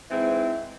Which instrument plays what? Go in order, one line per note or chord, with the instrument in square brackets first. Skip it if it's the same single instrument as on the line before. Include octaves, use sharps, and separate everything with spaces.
[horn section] G#2 E3 G#3 C4 E4